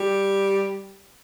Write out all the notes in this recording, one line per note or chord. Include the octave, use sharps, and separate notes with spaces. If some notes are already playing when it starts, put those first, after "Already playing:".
Already playing: G3